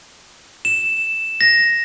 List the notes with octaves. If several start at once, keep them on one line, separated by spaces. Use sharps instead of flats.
E7
A#6